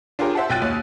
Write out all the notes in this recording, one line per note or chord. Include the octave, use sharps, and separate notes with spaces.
D4 F4 G4 G#4 A#4 C#5
C5 E5 F#5 A5
B1 F4 G5 F#6 A6 D#7
D#2 C#5